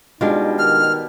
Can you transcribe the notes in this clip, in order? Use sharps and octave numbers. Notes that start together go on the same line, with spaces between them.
B2 G3 G#3 D4 D#4 F4
D#3 F6